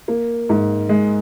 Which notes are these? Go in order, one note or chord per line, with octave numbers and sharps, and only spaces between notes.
A#3
G#2
G#3